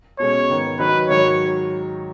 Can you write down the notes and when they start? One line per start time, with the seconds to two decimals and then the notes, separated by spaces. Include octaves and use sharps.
0.19 B2 G#3 C#4 C#5
0.49 G#2 D#3 B3
0.79 D#3 F#3 D#4 B4
1.09 G#2 D#3 F#3 C#5